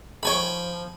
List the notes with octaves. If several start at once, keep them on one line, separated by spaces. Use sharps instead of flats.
D#3 F3 D4 C#5 G5 G#5 B5